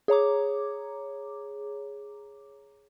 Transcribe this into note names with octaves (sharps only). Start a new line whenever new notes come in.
G#4 C#5 A#5 D6